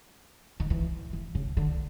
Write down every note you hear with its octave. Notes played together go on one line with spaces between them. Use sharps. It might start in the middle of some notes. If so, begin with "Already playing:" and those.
D#3
E3
E3
C#3
D3